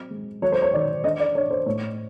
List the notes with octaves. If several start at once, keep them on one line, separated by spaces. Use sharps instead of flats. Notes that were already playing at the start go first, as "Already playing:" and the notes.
Already playing: F#3 C4
G#3
F#3 C#5
C5
C#5
D#3 D5
D4 D#5
D5
D4 C#5
C5
A2 C#5